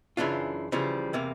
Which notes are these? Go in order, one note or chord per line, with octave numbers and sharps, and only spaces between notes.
F#2 C#3 E3 D4 F4
C#3 E3 F3 G3
E2 C3 A#3